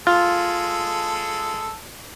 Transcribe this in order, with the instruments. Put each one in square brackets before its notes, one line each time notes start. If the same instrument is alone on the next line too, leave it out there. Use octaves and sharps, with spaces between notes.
[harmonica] G#3 A4 [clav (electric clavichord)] F4